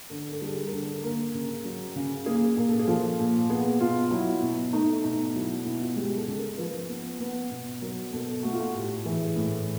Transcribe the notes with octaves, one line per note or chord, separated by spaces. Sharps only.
D3 A4
A4
G3 G#4
A#4
D3 A4
A#3 A#4
C#3
F#3
C#3
A#3 G#4
A#2 A#4
A4
G#4
F3 A4
A#2
B3 G#4
B2 F4
F#3 E4
B2
A3 D#4
B2 D#4
F#3 E4
B2 E4
F4
G#3 G4
A4
C#3
A#4
F3 B4
B3
B3
B2
F#3 A#4
B2 A4
A3 F#4
F4
F#4
A2 G4
E3 G#4
A2